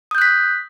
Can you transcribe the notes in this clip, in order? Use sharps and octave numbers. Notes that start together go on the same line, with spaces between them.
D#6 F#6 G6 B6